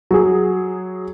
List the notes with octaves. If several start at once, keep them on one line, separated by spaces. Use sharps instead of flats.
F#3 G#4